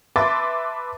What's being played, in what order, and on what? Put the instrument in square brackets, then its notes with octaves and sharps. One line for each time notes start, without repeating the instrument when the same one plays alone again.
[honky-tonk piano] B4 E5 A5 C6 D6 A6